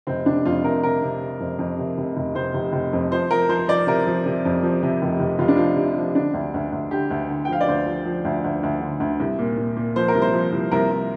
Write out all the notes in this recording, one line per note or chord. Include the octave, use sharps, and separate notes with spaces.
F1 C4
F1 D4
F2 F4
C3 A#4
C3 A#4
C3
C3
F2
F2
C3
F1
F1
F1 C5
F1
F1
F2
F3 C5
F3 A#4
F3 C5
F3 D5
C3 A#4
F3
C3
F2
F3
C3
F1
F1
F1 F4
D4
F3 F4
C3
F3
D3 D4
D2
D2
D2
D3 G4
D2
D3
G5
F3 F5
D5
D2 C5
F3
F3
D2
D2
D2
D3
D2
C2
A#2
A#2
A#2
F3 C5
A#4
C2
C5
F3
C2
C2 A#4
C2